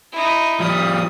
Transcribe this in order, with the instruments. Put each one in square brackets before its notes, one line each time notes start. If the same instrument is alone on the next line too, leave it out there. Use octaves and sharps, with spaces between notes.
[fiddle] D#4 E4
[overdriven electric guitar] F3 G3 [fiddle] D#6